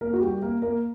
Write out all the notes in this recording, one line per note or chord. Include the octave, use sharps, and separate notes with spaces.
A#3 A#4
F#4
G3 G4
A#3 A#4
A#3 A#4